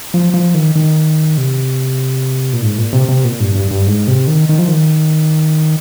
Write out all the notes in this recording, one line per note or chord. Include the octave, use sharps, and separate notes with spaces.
F3
F3
D#3
D#3
C3
A#2
G#2
A#2
C3
C3
A#2
G2
G2
G2
G#2
C3
D#3
D#3
F3
D#3